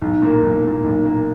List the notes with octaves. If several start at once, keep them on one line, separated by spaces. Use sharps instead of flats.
B1
A#2 A#3
B1
A#2 A#3
B1
A#2 A#3